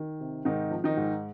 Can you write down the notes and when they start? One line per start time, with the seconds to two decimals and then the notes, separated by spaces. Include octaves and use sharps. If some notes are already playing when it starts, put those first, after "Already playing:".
Already playing: D#3
0.20 C3
0.45 G#2 D#3 D#4
0.71 F3
0.84 D#3 D#4
0.97 G#2